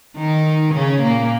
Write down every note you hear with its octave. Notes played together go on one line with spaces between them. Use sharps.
D#3 D#4
C#3 C#4
A#2 A#3